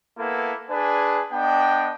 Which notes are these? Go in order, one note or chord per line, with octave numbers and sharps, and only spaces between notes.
A#3 B3 E4 A4
D4 G#4 B4 G#5
B3 D4 D#5 G5